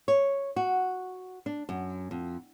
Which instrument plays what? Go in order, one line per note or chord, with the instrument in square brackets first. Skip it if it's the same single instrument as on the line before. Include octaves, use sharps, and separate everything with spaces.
[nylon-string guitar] C#5
F#4
D4
F#2
F2